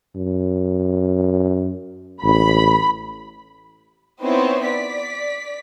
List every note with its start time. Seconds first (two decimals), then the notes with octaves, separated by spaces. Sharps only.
0.16 F#2
2.23 A1 B5
4.22 B3 C4 D#4 E4 C5 C#5
4.65 D5 B6